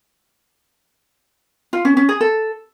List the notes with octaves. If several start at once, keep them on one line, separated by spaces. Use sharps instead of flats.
F4
C#4
C#4
G#4
A4